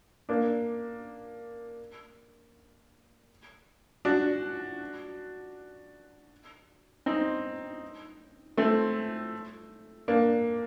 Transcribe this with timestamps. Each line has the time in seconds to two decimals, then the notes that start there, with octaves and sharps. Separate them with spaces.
0.29 A#3 D4
4.05 D4 F#4
7.06 C4 D#4
8.57 A3 C4
10.08 A#3 D4